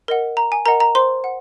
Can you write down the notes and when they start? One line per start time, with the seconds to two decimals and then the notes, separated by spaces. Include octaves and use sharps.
0.08 A#4 D#5 F#5
0.37 A#5
0.52 G#5
0.66 A#4 D#5 F#5 A#5
0.80 A#5
0.95 C5 C6
1.24 F#5